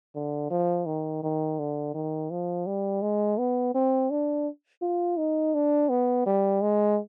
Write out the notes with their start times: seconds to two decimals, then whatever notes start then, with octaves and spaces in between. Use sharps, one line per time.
0.15 D3
0.50 F3
0.86 D#3
1.23 D#3
1.59 D3
1.94 D#3
2.31 F3
2.66 G3
3.02 G#3
3.38 B3
3.74 C4
4.10 D4
4.82 F4
5.18 D#4
5.54 D4
5.89 B3
6.26 G3
6.61 G#3